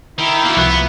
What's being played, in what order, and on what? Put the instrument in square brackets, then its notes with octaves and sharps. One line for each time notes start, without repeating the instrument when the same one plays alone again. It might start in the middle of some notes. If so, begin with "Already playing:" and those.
[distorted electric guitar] D#3 [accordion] E4 E5
[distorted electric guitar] A#3 F#4
[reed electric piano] C2 F3 F#6 [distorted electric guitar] B3